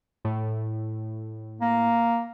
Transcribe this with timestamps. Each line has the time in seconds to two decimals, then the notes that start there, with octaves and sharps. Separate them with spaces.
0.25 A2
1.61 A#3